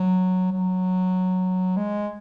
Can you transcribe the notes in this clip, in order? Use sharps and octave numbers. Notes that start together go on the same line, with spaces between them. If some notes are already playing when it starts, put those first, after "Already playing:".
Already playing: F#3
F#3
G#3